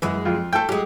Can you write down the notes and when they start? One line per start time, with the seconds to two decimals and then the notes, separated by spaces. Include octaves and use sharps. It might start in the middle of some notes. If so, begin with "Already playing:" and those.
0.02 F#2 E3 G#3
0.25 F2 F4
0.53 A3 A4 C5 G5
0.69 F#3 G#3 G4